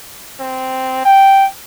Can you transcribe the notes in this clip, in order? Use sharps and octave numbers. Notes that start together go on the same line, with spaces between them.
C4
G5